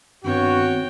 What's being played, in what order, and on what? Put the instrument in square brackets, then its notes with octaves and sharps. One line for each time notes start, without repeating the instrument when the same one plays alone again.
[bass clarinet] G2 [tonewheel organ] D#3 B3 C4 [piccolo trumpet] F#4 [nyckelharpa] C#5 G5